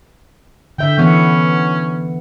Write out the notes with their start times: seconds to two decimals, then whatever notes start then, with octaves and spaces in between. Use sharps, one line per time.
0.78 D3 E5 G5
0.98 E3 B3 C#4 F#5